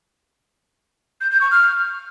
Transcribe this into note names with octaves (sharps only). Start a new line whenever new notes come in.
G6
G6
C#6
F6